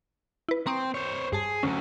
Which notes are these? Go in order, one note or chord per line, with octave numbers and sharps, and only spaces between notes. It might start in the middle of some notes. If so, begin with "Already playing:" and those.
E4 B4
C4 A#5 C#6 D#6
C5 C#5
G2 G#4 A5
D2 F#3 C#4